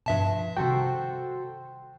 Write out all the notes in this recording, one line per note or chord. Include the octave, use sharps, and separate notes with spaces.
G2 B2 F3 E5 A5
C3 D#3 G3 F#4 A4 C5 G5